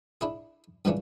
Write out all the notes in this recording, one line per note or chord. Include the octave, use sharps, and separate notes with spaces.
D4 E4 G#4
G2 A#2 C#3 E3 C#4 D4